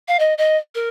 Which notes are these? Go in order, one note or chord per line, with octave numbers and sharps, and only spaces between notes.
F5
D#5
D#5
A#4